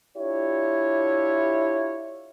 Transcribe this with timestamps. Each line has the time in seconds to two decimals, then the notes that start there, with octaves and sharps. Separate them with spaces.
0.17 D4 E4 F4 G4 C#5